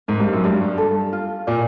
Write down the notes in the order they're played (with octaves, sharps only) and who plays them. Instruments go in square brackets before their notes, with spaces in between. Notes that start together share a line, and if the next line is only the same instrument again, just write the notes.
[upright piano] G#2 [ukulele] A#4
[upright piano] G2
F#2
[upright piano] G2 [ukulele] D4
[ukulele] A4
F4
[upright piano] A#2 [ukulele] D5